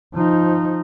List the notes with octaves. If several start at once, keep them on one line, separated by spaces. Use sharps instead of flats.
F3 D#4